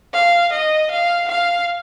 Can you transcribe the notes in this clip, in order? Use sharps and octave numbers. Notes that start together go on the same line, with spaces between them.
F5
D#5
F5
F5